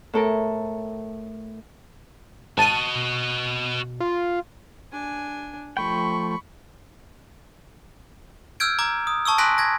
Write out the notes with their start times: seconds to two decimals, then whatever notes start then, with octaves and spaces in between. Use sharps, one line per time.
0.13 A2 A4 A#4
2.58 G#1 F#4 D#5 A5 D#7
2.95 B2
4.00 F4
4.92 D4 G#5
5.77 F3 A3 G5 B5 C#6
8.60 E6 F6 G6 G#6 D7
8.79 A#5 D6 G#6
9.07 D#6
9.26 A5 C#6 D#6 E6
9.38 G#5 C6 F#6 A#6 B6 D7
9.58 G#6 A#6